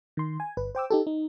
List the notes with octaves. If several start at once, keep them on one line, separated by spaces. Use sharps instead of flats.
D#3 C6
G#5
G1 B4
C5 G5 D6 E6
D#4 G4 A4
D#4